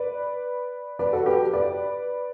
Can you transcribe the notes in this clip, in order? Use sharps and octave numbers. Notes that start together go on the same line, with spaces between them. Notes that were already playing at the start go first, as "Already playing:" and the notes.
Already playing: B4 D5
B4 D5
F#4 A4
G4 B4
B4 D5